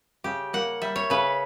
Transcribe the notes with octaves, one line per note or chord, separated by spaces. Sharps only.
C#3 G4
A#3 F#5
G3 E5
C#5
C#3 B4